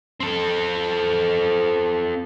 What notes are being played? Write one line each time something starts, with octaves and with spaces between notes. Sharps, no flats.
C4 A4